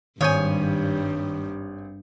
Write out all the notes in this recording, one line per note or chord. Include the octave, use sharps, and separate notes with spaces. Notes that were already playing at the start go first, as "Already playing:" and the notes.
G#1 G2 D#3 G3 C#5 G#5 D#6 G6